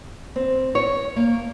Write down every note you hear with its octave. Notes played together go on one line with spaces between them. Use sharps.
C4
C#5
A#3